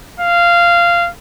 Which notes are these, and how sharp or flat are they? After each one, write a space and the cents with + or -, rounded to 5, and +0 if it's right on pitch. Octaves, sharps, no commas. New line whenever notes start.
F5 -15